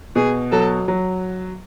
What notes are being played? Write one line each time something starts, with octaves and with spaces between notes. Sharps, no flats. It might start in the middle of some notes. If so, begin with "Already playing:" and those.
B2 G#4
F#3 A4
F#3